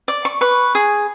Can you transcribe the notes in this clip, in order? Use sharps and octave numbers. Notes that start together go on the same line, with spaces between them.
D5
C#6
B4 C#6
G#4